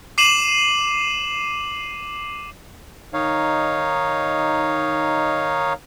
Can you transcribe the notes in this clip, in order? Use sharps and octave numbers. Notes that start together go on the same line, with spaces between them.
D6 C7 D#7 E7 F#7
D#3 D#4 C#5 F5